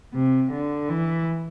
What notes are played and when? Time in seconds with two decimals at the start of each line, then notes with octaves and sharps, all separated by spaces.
0.14 C3
0.52 D3
0.89 E3